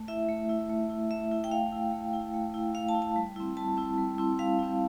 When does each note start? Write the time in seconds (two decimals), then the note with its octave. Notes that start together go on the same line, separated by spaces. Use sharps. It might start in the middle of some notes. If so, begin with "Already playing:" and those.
Already playing: A3
0.08 E4 E5
0.29 A3
0.49 E4
0.69 A3
0.90 E4
1.11 A3 E5
1.31 E4
1.44 G5
1.51 A3 F5
1.72 E4
1.93 A3
2.13 E4
2.34 A3
2.54 E4
2.75 A3 F5
2.89 A5
2.95 E4
3.02 A5
3.16 G3
3.36 C4 E4
3.57 G3 A5
3.77 C4 E4
3.98 G3
4.18 C4 E4
4.39 G3 F5
4.59 C4 E4